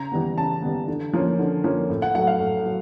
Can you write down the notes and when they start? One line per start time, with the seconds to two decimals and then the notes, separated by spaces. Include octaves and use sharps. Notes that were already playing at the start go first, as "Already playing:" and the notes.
Already playing: C#3 A#5
0.12 E3 G3 B3
0.37 C#3 A5
0.63 E3 G3 B3
0.88 D3
1.13 F3 A#3 C#4
1.39 D3
1.64 F3 A#3 C#4
1.90 A2
2.02 F#5
2.15 F#3 A3 F#5
2.27 F5
2.40 A2
2.66 F#3